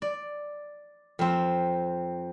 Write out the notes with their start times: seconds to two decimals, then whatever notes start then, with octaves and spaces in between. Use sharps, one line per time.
0.02 D5
1.19 F2 C4